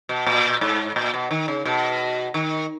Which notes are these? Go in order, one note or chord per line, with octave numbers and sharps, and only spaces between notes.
B2
A#2
G#2
A#2
B2
D#3
C#3
B2
D#3